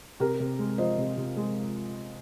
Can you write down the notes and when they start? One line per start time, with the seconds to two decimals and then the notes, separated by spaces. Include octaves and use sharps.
0.20 C3 G4 A#4
0.40 C3
0.59 G#3
0.78 F3 C5 D#5
0.98 C3
1.18 C3
1.37 G#3